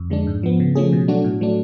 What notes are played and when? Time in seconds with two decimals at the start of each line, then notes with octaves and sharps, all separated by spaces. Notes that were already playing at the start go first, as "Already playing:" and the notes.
Already playing: F2
0.10 D3 G#3 D4
0.27 G#2
0.43 F3 B3
0.60 C#3
0.75 F3 A3 C#4 G#4
0.93 B2
1.08 F#3 A3 D4 F#4
1.24 A2
1.41 F#3 A3 D4